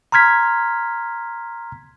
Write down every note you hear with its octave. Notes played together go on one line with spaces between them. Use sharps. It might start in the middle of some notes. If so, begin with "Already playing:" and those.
A#5 C6 F6 G#6 B6